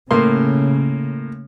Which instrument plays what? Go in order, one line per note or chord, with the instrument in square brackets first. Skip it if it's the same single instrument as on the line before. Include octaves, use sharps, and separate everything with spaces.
[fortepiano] A2 A#3 C6 [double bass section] C#3